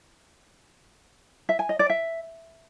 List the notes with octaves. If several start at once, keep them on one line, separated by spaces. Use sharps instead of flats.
E5
G#5
D#5
D5
E5